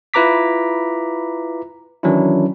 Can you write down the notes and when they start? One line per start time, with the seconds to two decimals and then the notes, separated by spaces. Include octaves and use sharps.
0.14 E4 F4 B4 A#5 D6 B6
2.03 D#3 E3 F#3 C#4 D4 E4